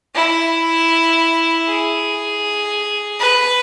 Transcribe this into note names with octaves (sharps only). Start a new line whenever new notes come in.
E4
G#4
B4